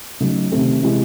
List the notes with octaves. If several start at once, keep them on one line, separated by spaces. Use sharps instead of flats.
C#3 F#3 A3 D#4
C3 D#3 A3 C4
C3 E3 G#3